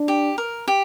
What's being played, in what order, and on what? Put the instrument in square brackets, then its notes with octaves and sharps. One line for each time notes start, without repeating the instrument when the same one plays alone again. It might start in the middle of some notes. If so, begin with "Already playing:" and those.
Already playing: [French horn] D4
[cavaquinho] G4
A#4
G4